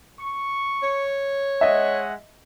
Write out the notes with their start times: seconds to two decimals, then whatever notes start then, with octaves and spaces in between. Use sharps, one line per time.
0.19 C#6
0.83 C#5
1.61 G#3 D#5 E5 F#5